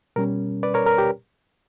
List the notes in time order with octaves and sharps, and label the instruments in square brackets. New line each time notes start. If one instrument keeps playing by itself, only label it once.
[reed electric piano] B2 G3 C#4 A#4
B4 D5
A#4 C#5
A#4
G4